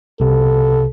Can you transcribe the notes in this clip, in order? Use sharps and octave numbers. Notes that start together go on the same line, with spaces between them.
C2 C3 A4